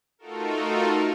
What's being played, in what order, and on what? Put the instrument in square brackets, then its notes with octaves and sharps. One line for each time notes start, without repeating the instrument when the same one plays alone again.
[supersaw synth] A3 D#4 F4 F#4 A4 A#4